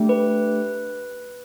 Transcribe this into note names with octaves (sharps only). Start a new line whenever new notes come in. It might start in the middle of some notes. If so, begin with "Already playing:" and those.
Already playing: A3 D4 G4
B4